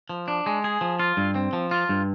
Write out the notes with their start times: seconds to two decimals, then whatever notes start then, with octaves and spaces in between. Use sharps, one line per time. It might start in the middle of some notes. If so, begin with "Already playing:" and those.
0.09 F3
0.28 D4
0.46 G#3
0.64 G#4
0.81 F3
1.00 F4
1.17 G2
1.35 C4
1.53 F3
1.71 F4
1.89 G2